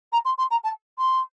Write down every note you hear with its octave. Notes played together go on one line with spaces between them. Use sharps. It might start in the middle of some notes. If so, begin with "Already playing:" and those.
A#5
C6
C6
A#5
A5
C6